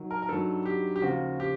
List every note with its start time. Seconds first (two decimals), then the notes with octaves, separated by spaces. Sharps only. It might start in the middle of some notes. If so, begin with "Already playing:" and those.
Already playing: D#3 F#3
0.11 A#4
0.22 A#4
0.29 G2 D#3 F#3 A4
0.65 G4
0.96 G4
1.02 D#2 C#3 F3 F#4
1.40 G4